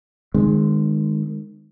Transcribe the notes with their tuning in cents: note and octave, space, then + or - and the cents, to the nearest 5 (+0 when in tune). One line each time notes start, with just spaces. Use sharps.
D#3 -30 G#3 +0 C4 -20